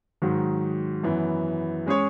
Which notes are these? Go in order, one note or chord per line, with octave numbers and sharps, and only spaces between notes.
G#2 D#3 F#3
F#2 E3 B3
G#3 C#4 G#4 C#5